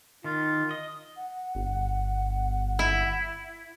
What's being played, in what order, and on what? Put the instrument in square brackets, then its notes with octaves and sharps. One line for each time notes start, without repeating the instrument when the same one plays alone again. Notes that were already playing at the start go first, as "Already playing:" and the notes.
[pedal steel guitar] D#3 [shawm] F4
[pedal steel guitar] D#5
[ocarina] F#5
[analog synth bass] G1
[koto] E4